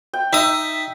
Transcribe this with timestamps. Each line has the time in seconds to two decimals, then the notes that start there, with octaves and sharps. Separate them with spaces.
0.13 G5
0.33 D#4 E5 D#6